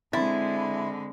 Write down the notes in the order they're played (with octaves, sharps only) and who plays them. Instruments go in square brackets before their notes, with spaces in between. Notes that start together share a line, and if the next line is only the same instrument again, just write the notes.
[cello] D3 G#3 [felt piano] C4 C6 A6 [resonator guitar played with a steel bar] E4